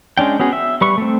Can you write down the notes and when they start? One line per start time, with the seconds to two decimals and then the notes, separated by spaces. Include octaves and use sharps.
0.18 G#3 C#4 D4 G5
0.39 B3 C#4 F#4 G#4
0.53 E5
0.81 G3 B4 C#6
0.98 A3 C4